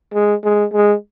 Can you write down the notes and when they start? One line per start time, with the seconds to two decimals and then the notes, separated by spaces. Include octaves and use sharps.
0.14 G#3
0.44 G#3
0.73 G#3